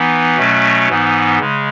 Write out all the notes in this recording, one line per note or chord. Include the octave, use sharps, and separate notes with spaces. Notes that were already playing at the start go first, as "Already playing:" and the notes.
Already playing: E3 B3 D#4
B2 F#3 A3 C#4
G#2 E3 B3 D#4
C#3 G#3